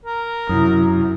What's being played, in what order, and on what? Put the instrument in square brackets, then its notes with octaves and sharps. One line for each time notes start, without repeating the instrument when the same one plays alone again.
[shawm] A#4
[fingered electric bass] F#2 [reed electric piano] C3 E4 D#6